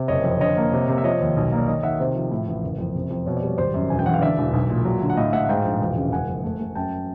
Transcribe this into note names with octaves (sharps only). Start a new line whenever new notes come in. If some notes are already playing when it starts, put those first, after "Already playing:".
Already playing: C3
F#1 C#5 D#5
F2
D3 C#5 D#5
A#3
C3
C3
E5
F3 C#5 D#5
D#2
B1
A#3
D5
D#3 C#5 D#5
D#3 E5 F#5
C3 C5
F3
A2
A1
F#1
F2
C3
F2
B2 C#5
D5
G3 C#5
G#1 C5 D5
F#2
E1 G#5
G5
E2 F#5
F5
D3 D5 E5
E1
B1
A#2
F#3
D3
F#5
A2 D#5 F5
A2 E5 F#5
F#5
G#2 F5 G5
A#1
E1
C#3
F#1 F#5 G#5
F2
A3
A3
F#2 G5 A5